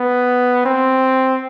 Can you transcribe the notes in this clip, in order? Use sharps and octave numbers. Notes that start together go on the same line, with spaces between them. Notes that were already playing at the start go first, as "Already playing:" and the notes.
Already playing: B3
C4